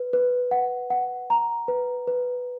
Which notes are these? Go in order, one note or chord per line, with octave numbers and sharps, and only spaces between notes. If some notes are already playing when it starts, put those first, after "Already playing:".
Already playing: B4
B4
F#5
F#5
A#5
B4
B4